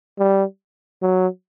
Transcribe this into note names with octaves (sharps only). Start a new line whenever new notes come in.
G3
F#3